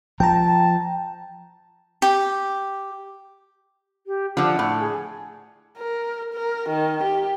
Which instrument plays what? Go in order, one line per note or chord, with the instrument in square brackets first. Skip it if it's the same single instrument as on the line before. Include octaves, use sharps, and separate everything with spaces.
[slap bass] F3 [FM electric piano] G5 A#5 [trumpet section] A5
[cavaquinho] G4
[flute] G4
[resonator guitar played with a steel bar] D3 F3 [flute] F#5
[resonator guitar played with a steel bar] A2
[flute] G#4
[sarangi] A#4
A#4
D#3
G4